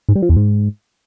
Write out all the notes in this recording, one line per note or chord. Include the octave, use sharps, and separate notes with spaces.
G#2
G3
F3
E2
G#2